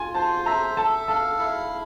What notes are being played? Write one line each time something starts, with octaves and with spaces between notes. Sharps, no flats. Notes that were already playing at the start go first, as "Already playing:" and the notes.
Already playing: F4 G#5
C5 A5
E5 A#5
A4 A5
F5 A5
E4